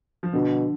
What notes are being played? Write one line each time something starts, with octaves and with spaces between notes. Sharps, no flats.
F3
B2 D3